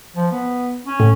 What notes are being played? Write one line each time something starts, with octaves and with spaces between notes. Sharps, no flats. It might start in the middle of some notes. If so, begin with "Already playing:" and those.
F3
B3
C#4
A2